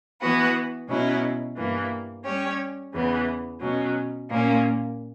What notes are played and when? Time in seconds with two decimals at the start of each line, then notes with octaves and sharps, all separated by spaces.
0.21 E3 B3 F#4 B4
0.88 B2 F#3 C#4 E4
1.57 G2 E3 A#3
2.24 G3 C#4 G4 C#5
2.93 E2 C#3 E3 B3
3.61 B2 F#3 C#4
4.29 A#2 A#3 C#4